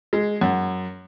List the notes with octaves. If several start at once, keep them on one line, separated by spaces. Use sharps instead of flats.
G#3
F#2